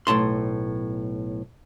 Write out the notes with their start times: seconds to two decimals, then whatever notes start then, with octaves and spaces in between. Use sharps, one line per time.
0.07 B1 A2 A5 C6